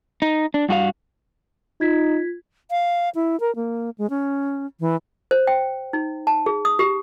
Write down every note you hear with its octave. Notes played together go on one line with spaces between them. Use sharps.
D#4
D4
G2 F#4 G4 F5
D#4 F4 G#6 B6
F5
E4
A#4
A#3
G#3
C#4
E3
C5
G5
D#4
A5
G#4
D#6
G4